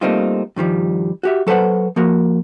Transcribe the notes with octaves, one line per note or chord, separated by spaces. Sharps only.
G3 A3 A#3 C4 D#4 F4
G2 D#3 F3 G3
F#4 G4 E5
F#3 A4 B4 C5 F#5
F3 A#3 F#4 A#4